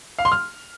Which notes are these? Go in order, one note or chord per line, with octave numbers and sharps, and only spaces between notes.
F5
C6
F6